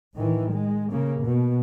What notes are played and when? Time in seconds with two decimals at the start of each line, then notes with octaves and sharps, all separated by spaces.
0.15 A2 D#3 E3
0.51 G#3
0.91 C#3 A#3
1.22 B2